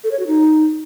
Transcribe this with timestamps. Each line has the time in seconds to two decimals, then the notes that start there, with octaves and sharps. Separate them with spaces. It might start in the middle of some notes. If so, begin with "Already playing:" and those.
0.04 A4
0.12 C#5
0.19 F#4
0.27 D#4